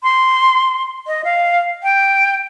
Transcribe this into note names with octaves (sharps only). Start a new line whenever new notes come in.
C6
D#5
F5
G5